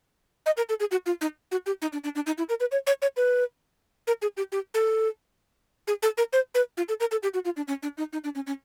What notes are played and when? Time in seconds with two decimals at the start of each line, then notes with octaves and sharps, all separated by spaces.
0.46 D#5
0.57 A#4
0.69 A4
0.80 G#4
0.91 F#4
1.06 F4
1.21 D#4
1.52 F#4
1.66 G4
1.82 D#4
1.93 D4
2.04 D4
2.15 D4
2.27 D#4
2.38 E4
2.49 A#4
2.60 B4
2.72 C#5
2.87 C#5
3.02 C#5
3.17 B4
4.07 A#4
4.22 G#4
4.37 G4
4.52 G4
4.74 A4
5.87 G#4
6.03 A4
6.18 A#4
6.33 C5
6.55 B4
6.77 F4
6.89 A4
7.00 A#4
7.11 A4
7.23 G4
7.34 F#4
7.45 F4
7.57 D4
7.68 C#4
7.83 D4
7.98 D#4
8.13 D#4
8.24 D4
8.35 C#4
8.47 C#4